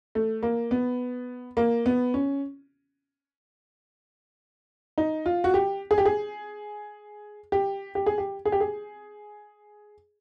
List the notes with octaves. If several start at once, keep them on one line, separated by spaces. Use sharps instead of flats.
A3
A#3
B3
A#3
B3
C#4
D#4
F4
F#4
G4
G#4
G4
G#4
G4
G4
G#4
G4
G#4
G4
G#4